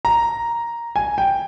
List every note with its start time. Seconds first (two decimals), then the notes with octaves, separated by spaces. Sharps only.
0.05 A#5
0.96 G#5
1.18 G5